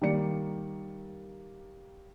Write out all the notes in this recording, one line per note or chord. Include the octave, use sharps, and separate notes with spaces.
D#3 G3 A#3 D5 C#7